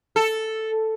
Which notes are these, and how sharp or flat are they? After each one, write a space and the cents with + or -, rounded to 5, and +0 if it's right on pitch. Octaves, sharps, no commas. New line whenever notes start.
A4 +0